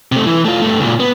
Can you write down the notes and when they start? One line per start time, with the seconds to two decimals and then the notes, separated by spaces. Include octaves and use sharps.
0.12 C3 A3
0.27 E3
0.45 A3 F4
0.62 G2 A3
0.80 C#2 A#2
1.00 B3